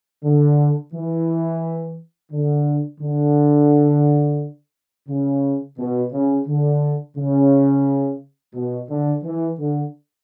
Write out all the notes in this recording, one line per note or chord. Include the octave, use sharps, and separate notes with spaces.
D3
E3
D3
D3
C#3
B2
C#3
D3
C#3
B2
D3
E3
D3